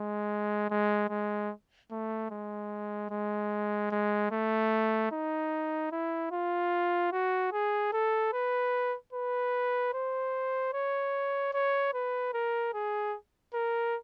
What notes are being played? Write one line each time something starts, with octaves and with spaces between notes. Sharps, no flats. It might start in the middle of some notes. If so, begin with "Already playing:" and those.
Already playing: G#3
G#3
G#3
A3
G#3
G#3
G#3
A3
D#4
E4
F4
F#4
G#4
A4
B4
B4
C5
C#5
C#5
B4
A#4
G#4
A#4